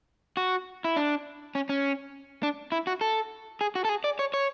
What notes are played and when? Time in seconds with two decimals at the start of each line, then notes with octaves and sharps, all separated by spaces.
0.37 F#4
0.84 E4
0.96 D4
1.55 C#4
1.69 C#4
2.43 D4
2.72 E4
2.87 F#4
3.01 A4
3.61 G#4
3.75 F#4
3.85 A4
3.89 G#4
4.04 D5
4.19 C#5
4.34 C#5